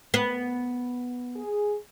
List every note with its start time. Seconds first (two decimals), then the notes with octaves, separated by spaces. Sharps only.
0.14 B3
1.36 G#4